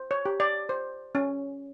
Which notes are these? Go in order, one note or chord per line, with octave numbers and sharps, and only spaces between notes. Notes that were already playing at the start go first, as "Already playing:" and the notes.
Already playing: C5
C#5
G4
D5
C5
C#4